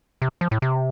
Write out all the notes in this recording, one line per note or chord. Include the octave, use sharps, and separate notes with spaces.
C3
F3
A2
C3